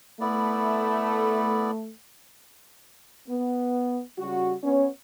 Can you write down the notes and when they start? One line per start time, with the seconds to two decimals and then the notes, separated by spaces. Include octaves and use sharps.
0.21 A3 B3 E4 D5
3.28 B3
4.18 C#3 G3 F#4
4.63 B3 C#4 C#5